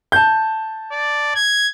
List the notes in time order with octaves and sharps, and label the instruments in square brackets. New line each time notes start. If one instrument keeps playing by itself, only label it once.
[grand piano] A5 G6
[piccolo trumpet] D5
G#6